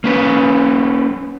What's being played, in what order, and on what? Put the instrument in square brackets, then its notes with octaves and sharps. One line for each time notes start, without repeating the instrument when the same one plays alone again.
[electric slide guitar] A#3 C#4 B4